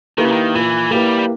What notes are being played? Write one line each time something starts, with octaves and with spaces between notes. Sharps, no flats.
D#3 A#3 E4 G4 B4
C#3
D#3
A#2 E3
G3 A#3 E4 G4 B4